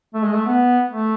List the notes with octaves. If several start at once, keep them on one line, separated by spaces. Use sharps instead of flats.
A3
G#3
A3
B3
A3